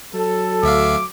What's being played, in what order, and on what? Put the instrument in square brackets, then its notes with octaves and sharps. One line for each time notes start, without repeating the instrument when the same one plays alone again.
[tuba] F#3 [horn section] A4
[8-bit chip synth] D2 E5 F5 [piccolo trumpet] D6